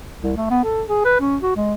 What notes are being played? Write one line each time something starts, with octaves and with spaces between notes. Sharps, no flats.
C2
A3
B3
A4
G#4
B4
C#4
F#4
G#3